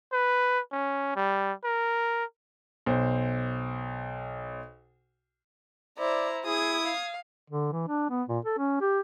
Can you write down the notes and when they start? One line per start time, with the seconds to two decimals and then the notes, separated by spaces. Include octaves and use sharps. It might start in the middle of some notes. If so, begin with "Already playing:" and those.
0.13 B4
0.72 C#4
1.16 G3
1.65 A#4
2.86 B1 C5
5.99 E4 C5 D5 A#5
6.46 E4 G#4 D#6 G#6
6.85 F5
7.50 D3
7.72 E3
7.88 D4
8.09 B3
8.29 A#2
8.45 A4
8.58 C#4
8.81 G4